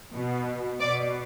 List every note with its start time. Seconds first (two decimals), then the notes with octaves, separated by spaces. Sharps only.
0.14 B2
0.80 B2 D5